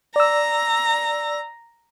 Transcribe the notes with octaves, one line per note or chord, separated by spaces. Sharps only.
D5 A#5 E6